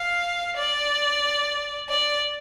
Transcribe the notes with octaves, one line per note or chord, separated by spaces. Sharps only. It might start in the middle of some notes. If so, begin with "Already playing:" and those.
Already playing: F5
D5
D5